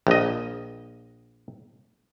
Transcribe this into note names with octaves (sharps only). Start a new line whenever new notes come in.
A#1 D#5